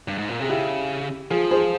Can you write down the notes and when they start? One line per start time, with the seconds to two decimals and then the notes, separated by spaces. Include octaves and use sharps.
0.08 G2
0.18 G#2
0.29 A#2
0.40 C3 G#4
0.49 C#3 E4 G4
1.30 F3 F4 G#4
1.51 G#4 C5